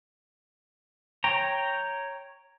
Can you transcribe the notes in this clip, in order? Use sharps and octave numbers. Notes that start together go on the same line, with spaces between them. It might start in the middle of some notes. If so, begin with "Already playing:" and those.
C#5 G5 A#5